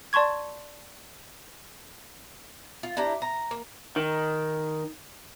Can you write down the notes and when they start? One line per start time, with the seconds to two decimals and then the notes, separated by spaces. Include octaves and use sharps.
0.13 D5 A5 C6 C#6 G#6
2.83 F4
2.97 D4 E4 G4 A#5
3.22 A#5
3.51 A#3
3.96 D#3